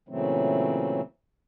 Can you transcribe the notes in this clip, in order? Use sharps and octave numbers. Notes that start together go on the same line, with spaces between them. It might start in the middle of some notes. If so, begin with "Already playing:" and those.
A#2 C#3 E3 F#3 A3 C4